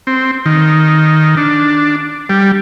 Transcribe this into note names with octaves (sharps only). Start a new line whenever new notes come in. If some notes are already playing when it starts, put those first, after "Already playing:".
C4
D#3
D4
G3